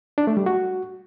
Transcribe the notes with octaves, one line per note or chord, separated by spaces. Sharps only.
D4
A3
G3
F#4